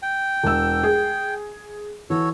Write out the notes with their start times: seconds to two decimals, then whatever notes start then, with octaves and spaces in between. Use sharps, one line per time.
0.02 G5
0.43 E1 E6
0.83 G#4
2.10 E3 F#4 A4 C#5